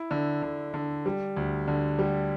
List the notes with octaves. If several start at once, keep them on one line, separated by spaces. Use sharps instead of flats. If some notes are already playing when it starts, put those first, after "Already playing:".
Already playing: E4
D3
D3
D3
G3
D2
D3
G3